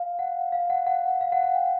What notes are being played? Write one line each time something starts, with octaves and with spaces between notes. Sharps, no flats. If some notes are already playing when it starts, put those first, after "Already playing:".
Already playing: F5
F#5
F5
F#5
F#5
F5
F#5
F#5
G5